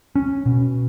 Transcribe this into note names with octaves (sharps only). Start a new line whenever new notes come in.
C#4
B2